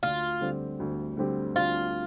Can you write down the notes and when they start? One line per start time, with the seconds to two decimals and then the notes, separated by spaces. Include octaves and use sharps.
0.03 D2 F4
0.41 D3 G3 C4 G4
0.80 D2
1.17 D3 G3 C4 G4
1.55 D2 F4